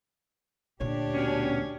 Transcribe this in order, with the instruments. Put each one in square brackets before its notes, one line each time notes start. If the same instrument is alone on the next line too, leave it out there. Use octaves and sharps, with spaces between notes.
[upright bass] D2 A#2 [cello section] D4 G4 [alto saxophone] C#5
[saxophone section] B2 C#4